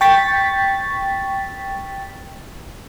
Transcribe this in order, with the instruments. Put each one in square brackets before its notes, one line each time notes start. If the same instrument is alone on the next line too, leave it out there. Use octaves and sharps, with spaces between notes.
[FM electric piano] G5 C#6 A6 B6